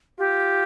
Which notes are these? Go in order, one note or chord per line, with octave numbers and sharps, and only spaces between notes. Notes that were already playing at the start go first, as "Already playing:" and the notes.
F4 G4